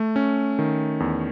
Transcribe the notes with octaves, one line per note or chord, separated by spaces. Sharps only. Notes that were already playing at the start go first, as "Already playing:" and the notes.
Already playing: A3
C#4
D#3
E2